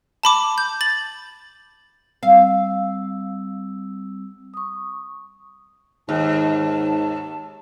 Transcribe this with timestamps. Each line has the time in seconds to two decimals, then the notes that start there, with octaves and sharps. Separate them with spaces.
0.23 A5 B5 D6
0.58 G6
0.81 A6 F#7
2.23 G3 C4 F5 E6
4.54 C#6 D#6
6.09 D#2 G#2 A5